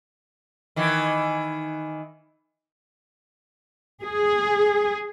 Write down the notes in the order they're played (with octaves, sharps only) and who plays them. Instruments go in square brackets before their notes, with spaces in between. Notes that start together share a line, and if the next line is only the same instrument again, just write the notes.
[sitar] D#3 E3
[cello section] G#4